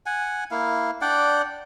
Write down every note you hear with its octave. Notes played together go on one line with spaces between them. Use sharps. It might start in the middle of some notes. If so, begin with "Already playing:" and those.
F#5 G#5
A#3 E4 F5
D4 D5 F#5 G5